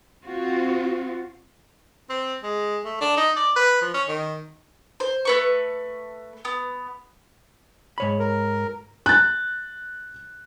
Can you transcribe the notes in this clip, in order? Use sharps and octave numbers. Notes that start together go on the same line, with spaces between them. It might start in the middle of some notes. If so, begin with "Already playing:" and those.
C4 F4 F#4
C4
G#3
A3
D4
D#4
D5
B4
F3
C#4
D#3
C5
A3 B4 C#6
B3
G#2 C#5 B5
A#4
F#6 A6